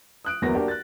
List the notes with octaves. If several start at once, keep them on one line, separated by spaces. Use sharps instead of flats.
D#6 F#6 D7
G1 E2 F#3 A#3 B3 A#6
A#3 D4 F#4 G4
F#6 A6